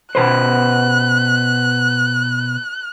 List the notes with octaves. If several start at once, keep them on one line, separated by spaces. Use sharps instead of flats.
B2 B4 C5 F#6